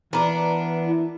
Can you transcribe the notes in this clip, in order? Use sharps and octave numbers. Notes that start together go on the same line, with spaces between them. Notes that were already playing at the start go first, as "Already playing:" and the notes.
E3 B3 D4 A#4 A#5 D6
E4